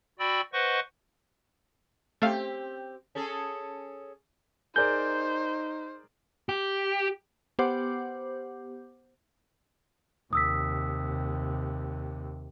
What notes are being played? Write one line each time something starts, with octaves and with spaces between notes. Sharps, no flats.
F#4 D5 G5 B5 E6
B4 C5 D#5 F#5 C#6
A3 C4 G4 F5
C#4 G#4 A4
D#4 G#4 A#4 C5 D5 G6
G4
B3 G4 C5 F#5 D6 G6
D#2 C3 D#6 E6 B6